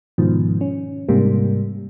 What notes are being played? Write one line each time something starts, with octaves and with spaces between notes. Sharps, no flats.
G#2 B2 D#3 F3
C#4
G#2 C3 G3 A#3